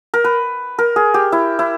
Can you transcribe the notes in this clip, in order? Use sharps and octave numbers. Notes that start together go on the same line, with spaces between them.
A#4
B4
A#4
G#4
G4
E4
E4